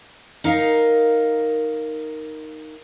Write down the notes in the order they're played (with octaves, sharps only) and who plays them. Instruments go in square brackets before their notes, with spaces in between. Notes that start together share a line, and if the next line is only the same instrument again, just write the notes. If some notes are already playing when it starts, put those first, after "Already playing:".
[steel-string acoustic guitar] D#4 A#4 D#5 F5